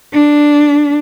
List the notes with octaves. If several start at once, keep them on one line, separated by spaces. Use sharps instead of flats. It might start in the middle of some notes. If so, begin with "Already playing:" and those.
D4